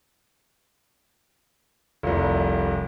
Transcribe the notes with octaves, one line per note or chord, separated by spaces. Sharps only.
F1 C2